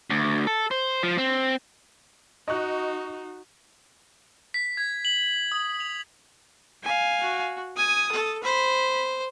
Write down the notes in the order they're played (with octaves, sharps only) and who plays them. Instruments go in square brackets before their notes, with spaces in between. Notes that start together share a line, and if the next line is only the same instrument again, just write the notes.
[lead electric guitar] D2
A4
C5
F3
C4
[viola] D#4 F#4 [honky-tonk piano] D#5 C#6 F#6
[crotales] B6
G#6
F#7
D#6
F7
[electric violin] F5 G#5
[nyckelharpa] F#4
[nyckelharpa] G#5 [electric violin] D#6
[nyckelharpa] A4
[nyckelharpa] C5 [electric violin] B5